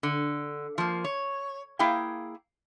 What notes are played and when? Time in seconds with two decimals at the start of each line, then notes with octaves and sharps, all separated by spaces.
0.03 D3
0.78 F3 A#3
1.04 C#5
1.79 A#3 E4 G#4 F5 G5